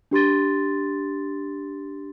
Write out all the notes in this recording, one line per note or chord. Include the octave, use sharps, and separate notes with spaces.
D4 G4 C6 A6